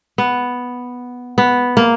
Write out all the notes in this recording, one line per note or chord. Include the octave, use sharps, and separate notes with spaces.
B3
B3
A#3